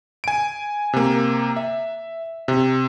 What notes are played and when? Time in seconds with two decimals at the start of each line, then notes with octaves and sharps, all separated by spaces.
0.24 G#5 D7
0.93 C3 A#3
1.56 E5
2.48 C3